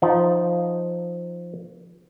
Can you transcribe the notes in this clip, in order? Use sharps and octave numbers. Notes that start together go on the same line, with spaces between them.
F3 D#4